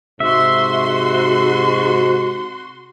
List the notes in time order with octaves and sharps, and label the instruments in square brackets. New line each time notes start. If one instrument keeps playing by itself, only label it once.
[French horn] G#2 [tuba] C3 [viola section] F#4 C6 [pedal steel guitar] E5